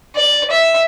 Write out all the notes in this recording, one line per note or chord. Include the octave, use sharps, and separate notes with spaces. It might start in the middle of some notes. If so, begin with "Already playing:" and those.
D5
E5